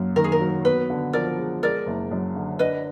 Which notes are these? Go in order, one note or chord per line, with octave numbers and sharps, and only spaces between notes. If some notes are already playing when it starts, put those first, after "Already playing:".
Already playing: F#2 A#3
D#3 A#4
G#4
A#4
F#3
B3 B4
D3
F3 A#4 D5
G#3
G#3 A#4 D5
F#1
F#2
D3
D4 B4 D#5